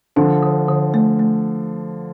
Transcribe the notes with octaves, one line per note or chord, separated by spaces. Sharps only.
D3 F3 D4
D3
D3
A3
A3